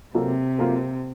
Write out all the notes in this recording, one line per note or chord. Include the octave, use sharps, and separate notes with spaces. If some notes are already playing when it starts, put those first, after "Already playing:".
C3 F#3 A#3 F4 A4
F#3 A#3 F4 A4